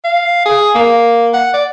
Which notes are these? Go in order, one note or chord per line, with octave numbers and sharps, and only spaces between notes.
F5
G#4
A#3
F#5
D5